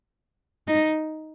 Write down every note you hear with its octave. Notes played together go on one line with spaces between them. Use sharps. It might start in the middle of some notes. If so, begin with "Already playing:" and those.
D#4